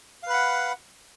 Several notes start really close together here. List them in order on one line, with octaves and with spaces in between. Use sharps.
F5 B4 B5 F#5